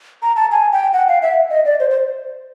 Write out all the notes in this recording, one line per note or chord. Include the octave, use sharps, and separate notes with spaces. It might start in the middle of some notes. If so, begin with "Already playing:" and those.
A#5
A5
G#5
G5
F#5
F5
E5
D#5
D5
C5
C5